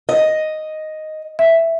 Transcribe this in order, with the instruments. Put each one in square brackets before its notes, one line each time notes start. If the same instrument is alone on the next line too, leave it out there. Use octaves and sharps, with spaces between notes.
[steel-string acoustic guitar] D#5
[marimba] E5